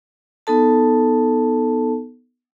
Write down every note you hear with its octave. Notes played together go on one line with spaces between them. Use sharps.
B3 D#4 A4 A5